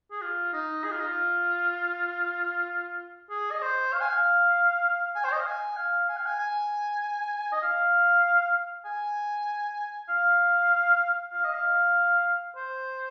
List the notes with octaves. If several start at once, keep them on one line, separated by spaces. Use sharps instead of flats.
G#4
F4
D#4
G#4
F4
D#4
F4
G#4
D#5
C5
F5
G#5
F5
G#5
C5
D#5
F5
G#5
F5
G#5
F5
G#5
G#5
D#5
F5
G#5
F5
F5
D#5
F5
C5